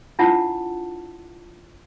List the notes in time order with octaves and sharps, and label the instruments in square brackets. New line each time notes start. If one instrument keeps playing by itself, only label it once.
[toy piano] D4 E4 F4 F#5 A5